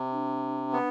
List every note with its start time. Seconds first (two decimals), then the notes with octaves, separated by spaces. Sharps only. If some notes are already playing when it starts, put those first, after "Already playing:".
Already playing: C3
0.11 D4
0.73 B3